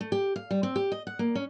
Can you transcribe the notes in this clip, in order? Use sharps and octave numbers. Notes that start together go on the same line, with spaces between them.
A3
G4
F5
G3
C4
G4
D#5
F#5
A#3
C#4